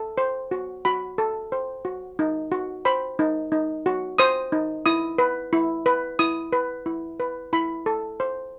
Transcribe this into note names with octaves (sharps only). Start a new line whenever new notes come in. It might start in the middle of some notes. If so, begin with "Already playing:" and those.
Already playing: A4
C5
F#4
F#4 B5
A4
C5
F#4
D#4
F#4
C5 B5
D#4
D#4
F#4
C5 D#6
D#4
E4 D#6
B4
E4
B4
E4 D#6
B4
E4
B4
E4 B5
A4
C5